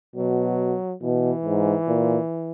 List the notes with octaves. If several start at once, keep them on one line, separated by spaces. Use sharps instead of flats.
B2 F#3
B2 E3
G#2
A#2